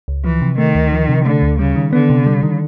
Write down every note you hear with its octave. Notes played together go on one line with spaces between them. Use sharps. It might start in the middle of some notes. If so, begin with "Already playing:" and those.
C#2
E3 F3
C3
D#3 A3
D2
F3
C3
D3 A3
D2
C#3 G3
D#3
D3 B3
C3
G3
D#3